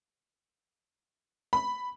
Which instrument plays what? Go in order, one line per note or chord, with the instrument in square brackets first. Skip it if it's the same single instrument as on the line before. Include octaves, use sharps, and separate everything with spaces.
[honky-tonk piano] B5